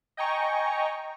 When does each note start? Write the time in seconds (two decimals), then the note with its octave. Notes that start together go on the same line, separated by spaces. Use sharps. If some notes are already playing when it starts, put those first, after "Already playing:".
0.17 D#5 G5 G#5 A#5 C#6